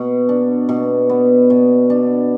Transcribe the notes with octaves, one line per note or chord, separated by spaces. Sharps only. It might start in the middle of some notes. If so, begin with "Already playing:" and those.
Already playing: B2
D4
B2
B3
B2
D4